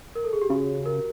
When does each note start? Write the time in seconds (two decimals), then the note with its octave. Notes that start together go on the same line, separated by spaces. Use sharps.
0.15 A#4
0.24 A4
0.33 G#4
0.42 G4
0.50 C#3 F#4
0.86 A#4